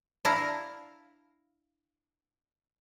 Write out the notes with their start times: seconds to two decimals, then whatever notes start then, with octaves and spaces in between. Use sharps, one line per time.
0.25 D4 E4 F5 A#5